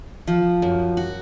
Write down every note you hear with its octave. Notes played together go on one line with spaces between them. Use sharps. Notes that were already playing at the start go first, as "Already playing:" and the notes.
F3
F#2
F#4